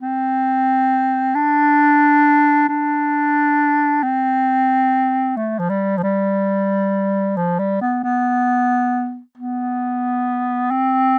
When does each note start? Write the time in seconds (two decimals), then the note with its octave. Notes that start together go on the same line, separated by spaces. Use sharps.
0.01 C4
1.35 D4
2.69 D4
4.03 C4
5.37 A3
5.59 F3
5.69 G3
5.98 F3
6.03 G3
7.37 F3
7.59 G3
7.81 B3
8.04 B3
9.37 B3
10.71 C4